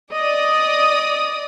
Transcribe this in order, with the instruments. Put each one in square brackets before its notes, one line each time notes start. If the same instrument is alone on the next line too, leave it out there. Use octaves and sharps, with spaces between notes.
[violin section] D5 D#6 [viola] D#5